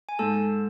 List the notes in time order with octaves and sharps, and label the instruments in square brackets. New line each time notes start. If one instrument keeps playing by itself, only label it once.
[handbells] G#5
[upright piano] G#2 [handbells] A4 A5